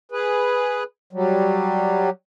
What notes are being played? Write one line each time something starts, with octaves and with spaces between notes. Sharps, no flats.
G#4 B4
F#3 G3